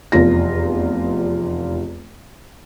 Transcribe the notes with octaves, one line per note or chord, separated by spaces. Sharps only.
F1 E2 F4 A#6